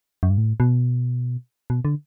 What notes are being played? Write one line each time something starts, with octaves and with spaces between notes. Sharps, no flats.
F#2
G2
A2
B2
B2
D3